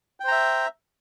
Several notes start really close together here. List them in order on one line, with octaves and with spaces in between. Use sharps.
G5 C5 A#5 E5